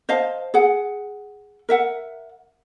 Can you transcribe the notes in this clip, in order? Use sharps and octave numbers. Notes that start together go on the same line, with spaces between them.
C5 D#5 F5 A5
G#4 F#5
A#4 E5 F#5